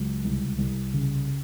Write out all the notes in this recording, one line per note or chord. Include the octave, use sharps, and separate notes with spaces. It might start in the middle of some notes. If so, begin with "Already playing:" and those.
Already playing: C#2 F#3
C2
C2
C#3